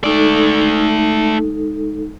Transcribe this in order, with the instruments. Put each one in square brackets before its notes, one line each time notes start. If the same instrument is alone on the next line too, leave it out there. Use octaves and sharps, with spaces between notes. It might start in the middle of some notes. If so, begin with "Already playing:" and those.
[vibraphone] G#3 D#4 A4 [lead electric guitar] A3 D5